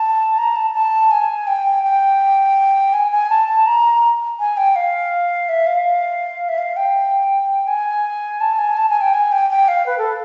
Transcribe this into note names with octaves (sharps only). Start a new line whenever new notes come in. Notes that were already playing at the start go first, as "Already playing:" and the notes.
Already playing: A5
A#5
A5
A5
G#5
G5
G5
G#5
G#5
A5
A5
A#5
G#5
G5
F5
E5
F5
E5
F5
G5
G#5
A5
G#5
A5
G#5
G5
G#5
G5
G5
F5
B4
A4